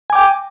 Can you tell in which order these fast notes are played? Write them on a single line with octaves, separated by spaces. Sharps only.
G#5 D6 G5